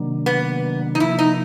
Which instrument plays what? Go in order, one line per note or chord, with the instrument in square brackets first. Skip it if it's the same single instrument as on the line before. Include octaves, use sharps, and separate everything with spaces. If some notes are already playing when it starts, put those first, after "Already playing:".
Already playing: [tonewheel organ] C3 D#3 F#3 A#3 D4
[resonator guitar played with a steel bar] B3
D#4
[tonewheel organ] C3 F3 A#3 [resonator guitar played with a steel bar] E4
[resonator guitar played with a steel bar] D#4